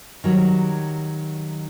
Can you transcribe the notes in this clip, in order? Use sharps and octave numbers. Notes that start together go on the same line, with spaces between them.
D#3 F#3 G3